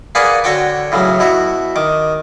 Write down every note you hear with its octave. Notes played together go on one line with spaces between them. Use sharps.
A#3 G#4 B4 D5 F#5 G#5
D3 F#4 C#5 G5 D6
A2 C#3 E3 F#3
B2 E4 F#4
D#3 D6